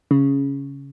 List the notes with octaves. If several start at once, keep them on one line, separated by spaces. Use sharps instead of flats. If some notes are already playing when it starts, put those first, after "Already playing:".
C#3